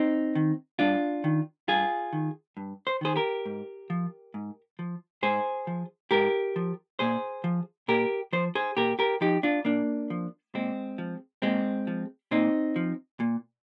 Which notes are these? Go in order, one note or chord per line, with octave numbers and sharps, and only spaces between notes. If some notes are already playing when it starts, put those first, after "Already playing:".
Already playing: C4 D#4
D#3
G2 D4 F4
D#3
G2 F4 G#4
D#3
G2
C5
D#3 G#4 C5
G4 A#4
G#2
F3
G#2
F3
G#2 G#4 C5
F3
G#2 G4 A#4
F3
A#2 G#4 C5
F3
A#2 G4 A#4
F3 C5
G#4 C5
A#2 G4 A#4
G4 A#4
F3 D#4 G4
D4 F4
A#2 A#3 D4
F3
A#2 G#3 C4
F3
A#2 G#3 C4
F3
A#2 C4 D#4
F3
A#2